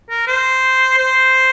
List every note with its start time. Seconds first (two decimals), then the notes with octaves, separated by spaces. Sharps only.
0.10 A#4
0.27 C5
0.98 C5